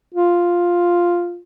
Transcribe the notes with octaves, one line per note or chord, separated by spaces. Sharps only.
F4